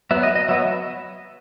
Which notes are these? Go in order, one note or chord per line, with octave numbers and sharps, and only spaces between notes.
F#3 B3 E5
D#5
D#5
F#3 B3 E5